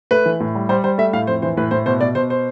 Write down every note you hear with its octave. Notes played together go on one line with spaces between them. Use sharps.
A3 B4
E3
A2
G3
G3 C5
G3 C5
A3 E5
A2 F5
F2 C5
E3 C5
A2 B4
A2 C5
B2 C5
B2 D5
B2 C5
C5